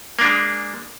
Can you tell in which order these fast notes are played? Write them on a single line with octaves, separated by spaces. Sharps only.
A#3 D4 G#3